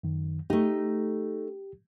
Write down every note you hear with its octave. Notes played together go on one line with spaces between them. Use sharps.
F#2 D#3
A3 D#4 G4